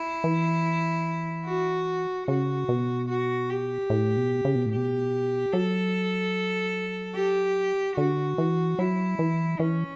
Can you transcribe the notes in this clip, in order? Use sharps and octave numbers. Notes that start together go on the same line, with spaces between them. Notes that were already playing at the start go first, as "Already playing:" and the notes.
Already playing: E4
E3
F#4
C#3 F#4
B2
F#4
G4
A2
B2
C#3
B2
A2
B2 G4
F#3 A4
G4
D3 F#4
E3
F#3 E4
E3
E3 C#4